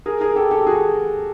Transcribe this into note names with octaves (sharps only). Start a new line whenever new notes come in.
G#4 A#4
G#4 A#4
G4 A4
G4 A4
F#4 G#4